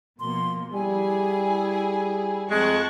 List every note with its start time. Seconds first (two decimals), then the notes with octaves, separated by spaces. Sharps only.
0.20 B2 F3 A#3 C6
0.73 G3 E4 G#4 G#5
2.50 F2 G#3 A5 C#6 F#6